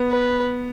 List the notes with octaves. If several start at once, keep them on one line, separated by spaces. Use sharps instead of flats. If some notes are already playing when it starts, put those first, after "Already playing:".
Already playing: B3
B4